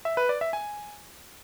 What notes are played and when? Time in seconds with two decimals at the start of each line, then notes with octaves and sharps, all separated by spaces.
0.05 E5
0.17 B4
0.29 D5
0.41 E5
0.53 G#5